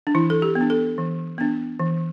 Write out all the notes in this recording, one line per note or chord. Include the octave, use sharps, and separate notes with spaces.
D4
E3 E4
A4
G4
B3
D4
A4
E3
B3 D4
E3